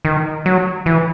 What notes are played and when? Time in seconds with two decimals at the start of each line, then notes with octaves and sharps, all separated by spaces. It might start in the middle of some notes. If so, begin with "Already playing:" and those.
0.05 D#3
0.46 F#3
0.86 E3